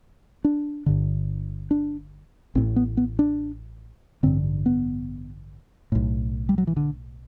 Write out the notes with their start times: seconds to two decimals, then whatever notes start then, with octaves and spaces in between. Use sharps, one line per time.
0.44 D4
0.86 G1 G2 D3
1.71 D4
2.55 A1 A2 C4
2.76 B3
2.97 B3
3.19 D4
4.23 A1 G2 D3 C4
4.66 B3
5.92 B1 A2
6.49 G3
6.58 F#3
6.67 E3
6.77 D3